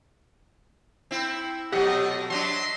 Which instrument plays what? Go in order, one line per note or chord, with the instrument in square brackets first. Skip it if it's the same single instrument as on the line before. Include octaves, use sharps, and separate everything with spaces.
[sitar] C4 E4
[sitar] B2 F#3 A3 [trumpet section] F4 D#5 [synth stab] G4 F#5
[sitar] F#3 D4 [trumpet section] D#5 E5 C6